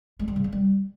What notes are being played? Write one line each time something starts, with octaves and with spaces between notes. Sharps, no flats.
G#3
G3
C#3
C#4
G3